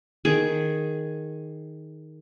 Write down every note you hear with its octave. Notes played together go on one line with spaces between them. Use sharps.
D#3 G#4